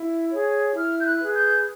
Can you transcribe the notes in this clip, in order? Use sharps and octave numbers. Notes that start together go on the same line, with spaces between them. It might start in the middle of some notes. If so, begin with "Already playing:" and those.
Already playing: E4
G#4 C#5
E4 F6
G6
F#6
G#4 B4
G6